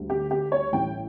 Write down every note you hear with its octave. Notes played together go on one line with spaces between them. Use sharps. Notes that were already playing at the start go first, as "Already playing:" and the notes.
Already playing: D2 D3 G3
G4
G4
C#5
A1 A2 G3 G5